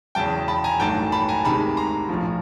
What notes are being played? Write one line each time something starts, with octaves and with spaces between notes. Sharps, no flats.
E2 C#3 F#3 G5 A5
A5 B5
G#5 A#5
A1 G2 D#3 F#3 A3 G5 A5
A5 B5
G#5 A#5
D2 C3 D#3 G#3 A5 B5
A#5 C6
A#1 A2 F3